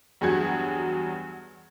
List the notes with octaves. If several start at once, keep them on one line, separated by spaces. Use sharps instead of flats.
E2 G2 F#3 G#4 F#5 G#6